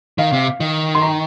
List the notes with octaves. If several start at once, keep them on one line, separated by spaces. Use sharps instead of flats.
D#3 F5
C3
D#3
C6
A#5